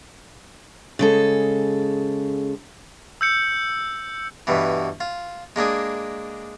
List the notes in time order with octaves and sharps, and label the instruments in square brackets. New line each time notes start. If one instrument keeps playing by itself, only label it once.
[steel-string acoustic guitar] C#3 G#3 A4
[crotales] E6 G6 C#7
[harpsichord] G2 B2 E3
F4
G#3 A#3 D4 G#4